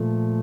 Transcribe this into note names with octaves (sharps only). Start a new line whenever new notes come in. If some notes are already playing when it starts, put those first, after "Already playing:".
Already playing: A#2 F3 A3